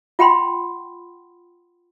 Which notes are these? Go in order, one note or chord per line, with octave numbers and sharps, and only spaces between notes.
F4 F#5 G5 B5 C6